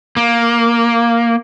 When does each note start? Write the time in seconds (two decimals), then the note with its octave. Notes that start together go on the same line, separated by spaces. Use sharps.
0.17 A#3